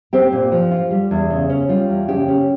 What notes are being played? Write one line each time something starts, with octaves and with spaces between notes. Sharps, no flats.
C4 G4
A#2
F3
F4
G3
E2
C#3
C#4
G3 F4
E2
C#3 G4
C#4